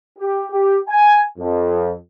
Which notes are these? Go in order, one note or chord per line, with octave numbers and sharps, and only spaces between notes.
G4
G4
G#5
F2